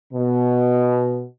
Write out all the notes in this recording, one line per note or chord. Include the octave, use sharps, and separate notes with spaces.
B2